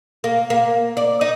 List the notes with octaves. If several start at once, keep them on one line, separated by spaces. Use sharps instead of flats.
A#3
A#3
D5
D#4